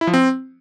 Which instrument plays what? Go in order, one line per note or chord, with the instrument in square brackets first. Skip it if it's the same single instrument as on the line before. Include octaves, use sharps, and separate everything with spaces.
[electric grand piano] E4
F3
C4